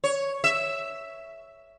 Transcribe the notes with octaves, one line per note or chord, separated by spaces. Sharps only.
C#5
E5